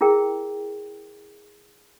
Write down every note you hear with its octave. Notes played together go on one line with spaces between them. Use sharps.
E4 G#4 A#4 G5